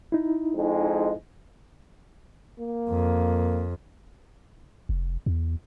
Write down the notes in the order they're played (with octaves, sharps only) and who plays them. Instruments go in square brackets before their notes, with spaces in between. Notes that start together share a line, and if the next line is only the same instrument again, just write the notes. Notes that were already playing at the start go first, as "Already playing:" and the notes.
[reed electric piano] D#4 E4
[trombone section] F2 G#3
[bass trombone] A#3
[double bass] F2
[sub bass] F1
E2